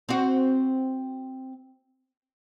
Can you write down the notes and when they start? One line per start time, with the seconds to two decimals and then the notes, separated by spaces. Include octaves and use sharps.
0.09 C4 F#4